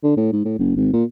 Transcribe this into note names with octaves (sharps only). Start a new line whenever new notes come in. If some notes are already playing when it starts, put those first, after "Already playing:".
D3
A2
G#2
A2
F#1
G#1
A#2